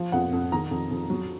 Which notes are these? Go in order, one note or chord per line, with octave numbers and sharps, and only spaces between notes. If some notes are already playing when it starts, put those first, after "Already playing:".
Already playing: F3
F2 F#5
F2
D#3 A#5
F2
F2
F#3